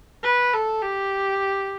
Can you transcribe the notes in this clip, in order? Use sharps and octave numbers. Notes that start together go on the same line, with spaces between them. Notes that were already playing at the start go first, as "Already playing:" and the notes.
B4
A4
G4